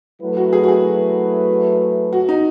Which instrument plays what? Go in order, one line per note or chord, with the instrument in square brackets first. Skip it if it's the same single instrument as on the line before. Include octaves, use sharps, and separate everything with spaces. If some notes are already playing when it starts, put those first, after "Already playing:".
[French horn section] F#3 A3 E4 B4
[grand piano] F#4
G#4
F#4
G#4
F#4
D#4